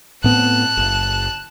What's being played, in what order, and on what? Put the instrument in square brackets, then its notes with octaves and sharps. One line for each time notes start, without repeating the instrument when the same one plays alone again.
[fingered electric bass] A2 B3 C4 [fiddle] A5 F#6
[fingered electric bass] F#1